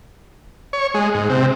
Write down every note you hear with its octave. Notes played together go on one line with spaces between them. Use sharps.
C#5
G#3
G#2
C3